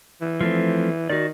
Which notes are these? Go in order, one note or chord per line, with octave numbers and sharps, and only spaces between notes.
E3
F3 A3 C4
D#3 F#4 D5